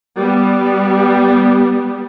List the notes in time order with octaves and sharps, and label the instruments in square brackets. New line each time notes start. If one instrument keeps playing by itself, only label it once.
[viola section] G3 B3